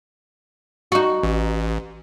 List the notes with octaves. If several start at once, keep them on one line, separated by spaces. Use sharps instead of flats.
D#4 F#4
A1